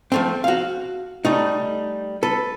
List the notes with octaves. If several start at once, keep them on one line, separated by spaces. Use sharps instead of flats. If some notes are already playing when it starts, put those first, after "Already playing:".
F3 A3 C4
F#4 F5
G3 A3 D#4
A4 B4